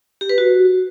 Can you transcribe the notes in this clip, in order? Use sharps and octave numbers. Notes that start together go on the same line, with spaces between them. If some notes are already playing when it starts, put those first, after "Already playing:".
G4
B4
F#4